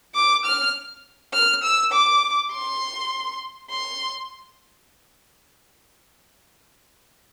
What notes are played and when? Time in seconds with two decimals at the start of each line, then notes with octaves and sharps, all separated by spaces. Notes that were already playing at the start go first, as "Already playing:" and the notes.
0.15 D6
0.46 F6
1.34 F6
1.63 E6
1.93 D6
2.52 C6
3.70 C6